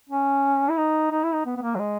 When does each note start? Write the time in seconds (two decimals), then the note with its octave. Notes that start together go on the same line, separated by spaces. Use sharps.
0.09 C#4
0.70 E4
0.77 D#4
1.12 D#4
1.23 E4
1.34 D#4
1.46 B3
1.57 B3
1.62 A#3
1.75 F#3
1.79 G#3